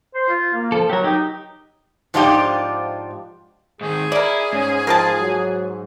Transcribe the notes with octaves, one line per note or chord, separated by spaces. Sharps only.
C5
F4
A#3
F3 A4
F#3 G4 A#4
D#4 G4
G#2 F3 D4 D#4 F4 G4
G#2 D#3 G#4
E4 A#4 D5
G#2 C#4
F3 A#4 G5 A5
F#3